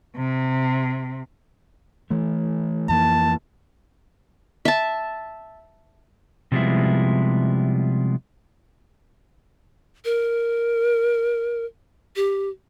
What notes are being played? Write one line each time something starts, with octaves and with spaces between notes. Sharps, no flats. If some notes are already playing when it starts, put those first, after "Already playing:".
C3
E3 A3
F2 E3 A#3 A5
E5 A5
C3 F3 G3 G#3 B3 E4
A#4
G4